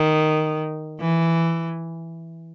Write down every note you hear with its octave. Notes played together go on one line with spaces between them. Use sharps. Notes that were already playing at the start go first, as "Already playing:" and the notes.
Already playing: D#3
E3